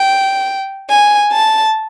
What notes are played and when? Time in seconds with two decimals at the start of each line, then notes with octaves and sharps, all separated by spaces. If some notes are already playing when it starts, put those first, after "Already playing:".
Already playing: G5
0.89 G#5
1.32 A5